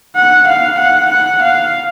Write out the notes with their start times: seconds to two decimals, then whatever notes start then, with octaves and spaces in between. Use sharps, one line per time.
0.16 F#5
0.47 F5
0.78 F#5
1.10 F#5
1.42 F5